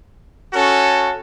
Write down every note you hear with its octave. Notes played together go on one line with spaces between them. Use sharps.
C#4 F#4 A4